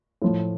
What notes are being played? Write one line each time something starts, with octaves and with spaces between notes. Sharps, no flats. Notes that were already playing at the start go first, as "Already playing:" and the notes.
A2 F3